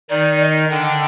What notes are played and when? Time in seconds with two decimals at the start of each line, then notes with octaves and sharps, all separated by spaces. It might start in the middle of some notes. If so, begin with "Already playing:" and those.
0.10 D#3 D#4 D5
0.40 D#5
0.70 D3 D4 G5